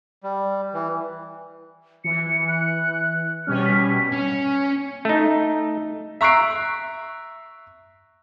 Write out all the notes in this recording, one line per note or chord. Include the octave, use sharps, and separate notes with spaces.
G3
E3
E3 C#7
F#6
B2 G3 C#4 F6
B6
C#4
A3 D#4
E5 A#5 C#6 F#6 C7 D7